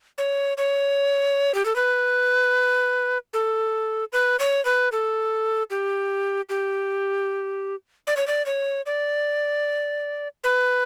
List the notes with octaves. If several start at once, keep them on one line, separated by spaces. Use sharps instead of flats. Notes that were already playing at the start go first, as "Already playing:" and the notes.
C#5
C#5
G4
A4
B4
A4
B4
C#5
B4
A4
G4
G4
D5
C#5
D5
C#5
D5
B4